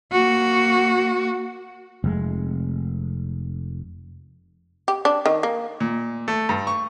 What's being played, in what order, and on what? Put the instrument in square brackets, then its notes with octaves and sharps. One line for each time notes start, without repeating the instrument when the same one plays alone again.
[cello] A#3 F#4
[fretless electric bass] F1 G#3
[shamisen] G4
D4
D#3
A#3
[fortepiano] A#2
A3
G2
C#6